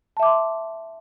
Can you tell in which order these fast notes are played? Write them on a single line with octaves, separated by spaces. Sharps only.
A5 E5 D6 C6